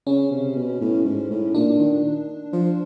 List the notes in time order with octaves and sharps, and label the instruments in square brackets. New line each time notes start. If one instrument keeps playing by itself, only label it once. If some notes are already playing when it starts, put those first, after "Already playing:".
[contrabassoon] C#3 [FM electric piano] C#4
[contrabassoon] C3
B2
A2
G#2
A2
[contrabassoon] A#2 [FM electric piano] D4
[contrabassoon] D#3
F3